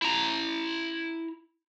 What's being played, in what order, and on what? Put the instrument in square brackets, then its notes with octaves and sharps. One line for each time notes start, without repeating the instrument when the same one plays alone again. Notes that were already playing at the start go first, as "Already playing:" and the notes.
[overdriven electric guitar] E4 A#5